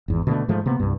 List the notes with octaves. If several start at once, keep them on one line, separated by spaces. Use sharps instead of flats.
G#1 E2
B2 D3 F#3 A3
G#2 F3 A3
C3 A#3 B3
C2 G2